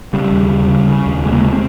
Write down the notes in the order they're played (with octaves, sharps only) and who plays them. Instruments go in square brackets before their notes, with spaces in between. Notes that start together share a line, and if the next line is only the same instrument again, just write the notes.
[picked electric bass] C#3 G3
D#2
C#3
C#3
C#3
D#2
C3 G#3
A#3
C3 G#3
C4